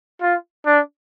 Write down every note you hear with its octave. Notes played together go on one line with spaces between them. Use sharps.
F4
D4